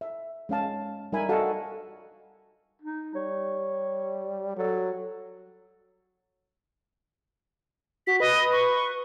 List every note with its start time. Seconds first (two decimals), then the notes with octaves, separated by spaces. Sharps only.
0.01 E5
0.49 G#3 C#4 F5 A5
1.13 G3 D#4 A#4 E5 G#5 B5
1.29 F#4 A4 D#5 F5 F#5 A5
2.82 D#4
3.15 G3 C#5
4.57 F#3 A4
8.07 F#4 B6
8.20 B4 D#5
8.53 C#6